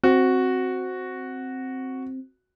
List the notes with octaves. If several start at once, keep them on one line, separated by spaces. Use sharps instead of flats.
C4 F#4